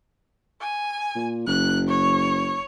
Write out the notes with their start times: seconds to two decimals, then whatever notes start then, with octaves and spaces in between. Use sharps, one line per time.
0.61 G#5
1.16 A#2
1.47 F#1 F#6
1.88 C#5